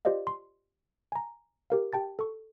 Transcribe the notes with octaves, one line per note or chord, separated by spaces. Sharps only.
F4 G4 C5 D5 D#5 F5
C6
G#5 A#5
G4 A#4 F5
G4 G5 A5 A6
A4 C#6